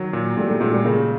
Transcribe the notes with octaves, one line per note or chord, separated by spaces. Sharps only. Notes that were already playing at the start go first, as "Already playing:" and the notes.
Already playing: D#3 F#3
A#2
A#2 G3 A3
G3 A3
A#2 F#3 G#3
G3 A3
C#3 G#3 A#3